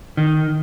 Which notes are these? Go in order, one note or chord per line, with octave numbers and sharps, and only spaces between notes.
D#3